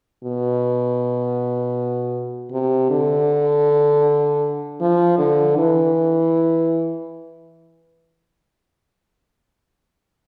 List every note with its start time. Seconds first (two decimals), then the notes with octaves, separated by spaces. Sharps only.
0.24 B2
2.52 C3
2.90 D3
4.80 F3
5.18 D3
5.56 E3